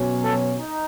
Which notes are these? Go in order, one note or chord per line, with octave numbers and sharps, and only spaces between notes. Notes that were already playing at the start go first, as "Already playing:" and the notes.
Already playing: B2 F#3 C#4
A4
D#4